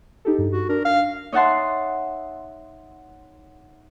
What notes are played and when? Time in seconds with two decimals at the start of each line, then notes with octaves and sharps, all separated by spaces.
0.25 D#4 G4 A4
0.39 G2
0.52 F#4
0.69 D4 A#4
0.85 F5
1.32 D#4 C#5 E5 F#5 A5 C6